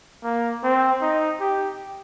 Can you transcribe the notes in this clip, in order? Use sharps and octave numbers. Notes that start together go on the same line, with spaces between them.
A#3
C4
D#4
G4